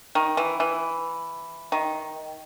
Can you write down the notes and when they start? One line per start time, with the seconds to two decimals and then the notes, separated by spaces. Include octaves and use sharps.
0.15 D#3
0.37 E3
0.60 E3
1.72 D#3